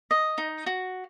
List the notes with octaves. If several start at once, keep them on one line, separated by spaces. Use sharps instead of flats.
D#5
D#4
F#4